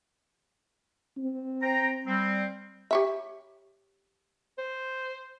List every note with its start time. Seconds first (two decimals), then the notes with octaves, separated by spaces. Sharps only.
1.17 C4
1.62 C5 G5 A#5
2.07 G3 C4
2.91 G4 C#5 E5
4.58 C5